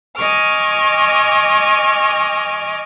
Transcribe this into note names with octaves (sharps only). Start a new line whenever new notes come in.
D#5 G#5 C#6 D6 F6